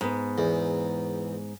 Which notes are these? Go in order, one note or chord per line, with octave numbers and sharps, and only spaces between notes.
G#2 B3
E2